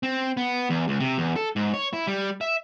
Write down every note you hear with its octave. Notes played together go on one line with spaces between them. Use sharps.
C4
B3
E2
C#2
C3
E2
A4
G#2
C#5
E4
G3
E5